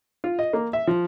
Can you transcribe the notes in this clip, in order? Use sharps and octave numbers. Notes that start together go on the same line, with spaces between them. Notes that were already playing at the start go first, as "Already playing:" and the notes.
F4
D#5
A#3
E5
F3